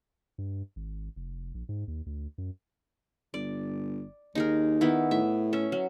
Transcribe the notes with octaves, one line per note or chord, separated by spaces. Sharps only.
G2
G#1
F1
A#1
G#2
D#2
D2
F#2
G1 D5
D#2 D#4 G#4 A#4
D#3 B3 E4
A2 E5
C#4 E5
F#3